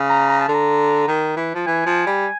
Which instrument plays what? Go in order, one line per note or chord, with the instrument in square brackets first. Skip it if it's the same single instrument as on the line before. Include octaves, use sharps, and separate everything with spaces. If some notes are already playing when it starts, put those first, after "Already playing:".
Already playing: [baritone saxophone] C#3
[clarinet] A#5
A#5
A5
[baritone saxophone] D3
[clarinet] A#5
[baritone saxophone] D#3
E3
F3
[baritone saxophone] E3 [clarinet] G#5
[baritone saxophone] F3
G3